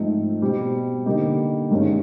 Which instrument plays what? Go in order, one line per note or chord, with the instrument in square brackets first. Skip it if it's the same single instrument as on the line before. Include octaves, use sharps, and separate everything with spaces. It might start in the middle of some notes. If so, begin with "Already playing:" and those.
Already playing: [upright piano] G#2 F3 A3 C4 D#4
B2 G3 C4
D3 G3 A#3 D#4
G2 D#3 G#3 C#4